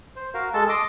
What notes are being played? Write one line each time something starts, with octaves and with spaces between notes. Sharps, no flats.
C5
F#4 A#4 F5
G#3 A4 A5
D#5 C6 D6